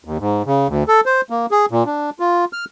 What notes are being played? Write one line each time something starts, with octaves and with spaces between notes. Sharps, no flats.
D#2
G#2
C#3
D2
A4
C5
A#3
G#4
A#2
D4
F4
F6